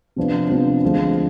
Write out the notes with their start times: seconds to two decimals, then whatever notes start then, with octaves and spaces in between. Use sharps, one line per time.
0.16 C3 F3 B3 D4
0.49 C3 F3 B3 D4
0.82 D2 D3 F3 G#3